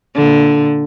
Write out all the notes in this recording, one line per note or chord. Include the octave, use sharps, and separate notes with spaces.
A#2 D3